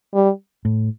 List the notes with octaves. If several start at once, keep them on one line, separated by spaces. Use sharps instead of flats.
G3
A2